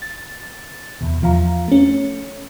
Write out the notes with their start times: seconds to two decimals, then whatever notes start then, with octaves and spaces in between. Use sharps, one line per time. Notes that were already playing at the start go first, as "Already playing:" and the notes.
0.02 A6
1.01 E2 B2
1.22 E2 F3 F5 A#5
1.68 A3 C#4